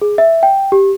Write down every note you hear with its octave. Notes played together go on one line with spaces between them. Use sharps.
G#4
E5
G5
G4